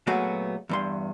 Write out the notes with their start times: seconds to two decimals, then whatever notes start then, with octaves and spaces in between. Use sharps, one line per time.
0.07 A#2 F#3 A3 B3 F#4 G#4
0.69 E2 G2 C6